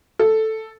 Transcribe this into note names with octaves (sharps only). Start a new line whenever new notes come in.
A4